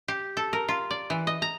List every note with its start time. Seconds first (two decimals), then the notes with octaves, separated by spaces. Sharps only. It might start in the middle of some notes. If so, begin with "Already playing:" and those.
0.08 G4
0.37 A4
0.53 A#4
0.69 F4
0.91 D5
1.10 E3
1.27 D#5
1.42 A#5